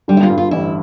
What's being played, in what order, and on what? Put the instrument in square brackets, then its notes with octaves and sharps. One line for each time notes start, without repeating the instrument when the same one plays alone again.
[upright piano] D3 [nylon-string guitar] G3
[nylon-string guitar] E4
F4
[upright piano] G2
[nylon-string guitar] F4
[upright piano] A1 [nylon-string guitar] E4